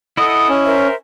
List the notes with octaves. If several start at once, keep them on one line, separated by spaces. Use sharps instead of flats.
E4 A4 D#5 F#5 D#6
C#4
A#4 C5 E5